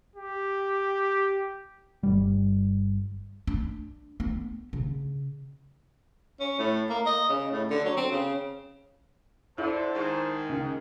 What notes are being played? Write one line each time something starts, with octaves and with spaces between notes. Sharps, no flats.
G4
G1 G3
D4
B3
C#3
C#4
A2
A#3
D#5
C#3
A2
D3
F#3
C4
C#3
D3 E4 C5 A5
G#2 D#3
C#2